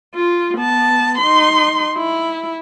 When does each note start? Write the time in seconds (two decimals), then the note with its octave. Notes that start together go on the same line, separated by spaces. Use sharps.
0.15 F4
0.57 B3 A5
1.18 D#4 C6
1.97 E4